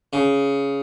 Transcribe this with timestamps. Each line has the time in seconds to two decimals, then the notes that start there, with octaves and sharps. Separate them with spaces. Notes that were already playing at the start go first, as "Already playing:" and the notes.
0.13 C#3